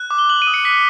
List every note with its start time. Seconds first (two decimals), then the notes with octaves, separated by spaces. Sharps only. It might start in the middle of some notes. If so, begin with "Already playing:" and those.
Already playing: F#6
0.11 D6
0.19 G7
0.29 F#6 F#7
0.42 D#7
0.47 D#6
0.54 C#7
0.65 F#6 B6